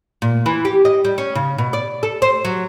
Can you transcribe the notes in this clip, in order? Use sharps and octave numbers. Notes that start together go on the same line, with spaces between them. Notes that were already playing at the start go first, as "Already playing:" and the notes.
A#2
E3
G4
D#5
G3
C#4
C#3
B2
D5
A4
C5
F#3